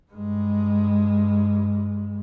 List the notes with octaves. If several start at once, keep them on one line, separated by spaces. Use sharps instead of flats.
G2 G#3